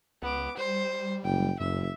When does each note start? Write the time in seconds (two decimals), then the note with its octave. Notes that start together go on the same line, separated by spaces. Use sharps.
0.22 C#2 B3 D6
0.57 G3 C5
1.25 F#1 G5
1.60 F#1 F#2 E5